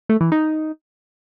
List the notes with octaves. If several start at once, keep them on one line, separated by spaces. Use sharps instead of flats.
A3
E3
D#4